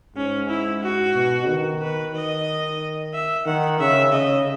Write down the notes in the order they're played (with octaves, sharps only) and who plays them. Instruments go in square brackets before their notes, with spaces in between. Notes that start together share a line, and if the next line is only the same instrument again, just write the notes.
[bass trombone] G#2 [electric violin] C#4
[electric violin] E4
F#4
[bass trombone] B2
D#3
[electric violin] B4
[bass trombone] D#3 [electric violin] D#5
[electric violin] E5
[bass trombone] D#3 [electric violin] F#5
[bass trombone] C#3 [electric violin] E5
[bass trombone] C#3 [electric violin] D#5